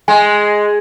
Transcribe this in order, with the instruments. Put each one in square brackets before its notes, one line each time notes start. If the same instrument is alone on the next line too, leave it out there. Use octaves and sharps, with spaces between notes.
[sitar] G#3 [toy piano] G#5